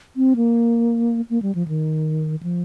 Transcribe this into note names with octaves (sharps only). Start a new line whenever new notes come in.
C4
A#3
A#3
G3
F3
D#3
F3